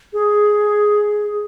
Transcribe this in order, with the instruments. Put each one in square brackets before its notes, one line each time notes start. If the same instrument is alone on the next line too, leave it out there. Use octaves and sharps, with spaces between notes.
[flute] G#4